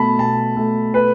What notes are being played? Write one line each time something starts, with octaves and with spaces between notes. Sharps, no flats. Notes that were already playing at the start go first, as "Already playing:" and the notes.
Already playing: B2 A3 A5 B5
B2 A5
A3
B4